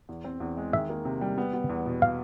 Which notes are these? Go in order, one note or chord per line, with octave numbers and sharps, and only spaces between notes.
E2
C4
E2
G#3
D#3 E5
A#3
C3
G3
B3
B3
E2
B2
F5